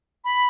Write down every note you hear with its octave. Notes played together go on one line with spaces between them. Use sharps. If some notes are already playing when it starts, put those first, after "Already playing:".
B5